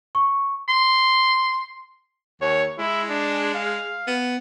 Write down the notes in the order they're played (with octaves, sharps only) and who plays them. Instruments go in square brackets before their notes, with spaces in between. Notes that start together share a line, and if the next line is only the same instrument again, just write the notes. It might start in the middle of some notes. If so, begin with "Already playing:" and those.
[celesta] C#6
[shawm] C6
[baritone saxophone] D#2 [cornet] C#5
[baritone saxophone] G#3 [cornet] E4
[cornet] D4
F5
[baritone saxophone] B3